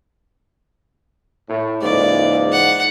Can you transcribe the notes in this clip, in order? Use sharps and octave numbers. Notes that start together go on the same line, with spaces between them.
A2
C#2 G#2 E3 A#3 D5
F#5